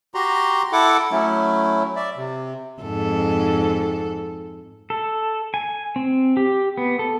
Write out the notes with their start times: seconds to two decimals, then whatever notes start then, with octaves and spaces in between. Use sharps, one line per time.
0.14 F#4 G4 A#5 C6
0.72 E4 A4 F#5 D6
1.11 F#3 A3 C#4 E4
1.96 D5 E5
2.16 C3
2.82 F2 G#2 A4
4.90 A4
5.54 G#5
5.96 C4
6.37 G4
6.78 B3
6.99 A4